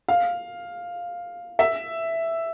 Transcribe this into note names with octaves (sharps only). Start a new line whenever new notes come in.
F5
E5